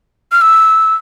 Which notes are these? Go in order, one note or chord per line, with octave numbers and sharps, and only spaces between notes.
F6
E6